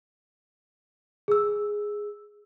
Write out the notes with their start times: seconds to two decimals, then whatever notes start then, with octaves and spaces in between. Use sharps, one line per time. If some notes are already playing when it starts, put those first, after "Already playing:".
1.28 G#4 E6